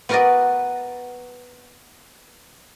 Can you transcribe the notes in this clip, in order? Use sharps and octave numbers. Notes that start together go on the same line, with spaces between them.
B3 F#4 A#4 B4 D5 D#5